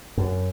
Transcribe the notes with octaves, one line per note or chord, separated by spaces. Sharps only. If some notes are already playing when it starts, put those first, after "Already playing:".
F#2